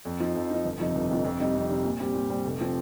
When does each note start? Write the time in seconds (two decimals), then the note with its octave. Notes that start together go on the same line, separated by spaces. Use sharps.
0.05 F2
0.20 F3 D#4
0.35 F2
0.50 F3 D#4
0.65 G1
0.80 F2 C3 F3 D#4
0.95 G1
1.10 F2 C3 F3 D#4
1.24 F2
1.40 C3 G3 D#4 G4
1.55 F2
1.69 C3 G3 D#4 G4
1.84 A#2
2.00 G3 C4 G4
2.14 A#2
2.30 G3 C4 G4
2.45 F1
2.61 F3 C4